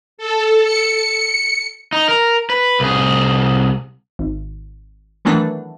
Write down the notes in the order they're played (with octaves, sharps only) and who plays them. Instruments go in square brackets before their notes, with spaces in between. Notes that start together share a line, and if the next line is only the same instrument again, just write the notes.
[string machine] A4
C#7
[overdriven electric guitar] D#4
A#4
B4
C2 G#4
[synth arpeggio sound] G#1
D#3 E3 F#3 A3 B3 D4